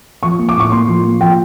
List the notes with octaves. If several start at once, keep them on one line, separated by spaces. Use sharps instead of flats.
F3 C#6
A#3
D6
A2 C#6
A#3 C6
F3
A#3
F3 G5